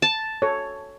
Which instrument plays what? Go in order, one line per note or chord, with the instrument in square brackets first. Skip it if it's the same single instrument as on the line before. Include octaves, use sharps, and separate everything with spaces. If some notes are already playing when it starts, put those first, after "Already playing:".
[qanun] A5
[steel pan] A4 C#5